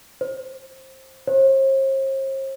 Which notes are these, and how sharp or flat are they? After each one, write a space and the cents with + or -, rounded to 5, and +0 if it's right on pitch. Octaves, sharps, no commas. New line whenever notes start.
C5 +15
C5 +45